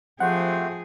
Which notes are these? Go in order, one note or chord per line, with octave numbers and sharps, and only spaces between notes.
F3 A3 C4 G4 G#4 F#5